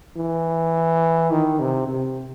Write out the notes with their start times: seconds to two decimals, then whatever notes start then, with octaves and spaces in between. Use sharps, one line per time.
0.17 E3
1.31 D#3
1.59 C3
1.88 C3